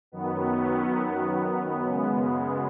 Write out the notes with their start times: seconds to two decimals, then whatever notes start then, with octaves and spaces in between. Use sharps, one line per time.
0.12 F#2 D#3 F#3 B3
1.82 F#2 C#3 G#3